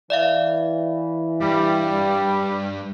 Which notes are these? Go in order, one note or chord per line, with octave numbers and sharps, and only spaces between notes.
E3 D5 E5 F5
G2 G3